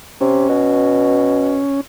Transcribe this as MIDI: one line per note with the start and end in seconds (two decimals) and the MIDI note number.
0.21 0.46 48
0.21 1.81 61
0.49 1.60 47